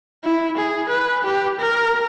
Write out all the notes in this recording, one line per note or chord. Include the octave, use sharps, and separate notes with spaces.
E4
G#4
B4
G4
A#4